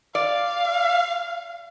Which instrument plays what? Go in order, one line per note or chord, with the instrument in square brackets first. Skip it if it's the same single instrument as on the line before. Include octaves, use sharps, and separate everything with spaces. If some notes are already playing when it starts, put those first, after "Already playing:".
[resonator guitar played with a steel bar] D5 [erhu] F5